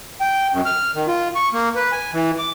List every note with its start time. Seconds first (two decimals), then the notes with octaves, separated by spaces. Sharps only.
0.21 G5
0.53 F#2
0.66 F6
0.95 D#3
1.07 F4
1.35 C#6
1.53 A#3
1.76 B4
1.92 G#5
2.13 E3
2.38 D6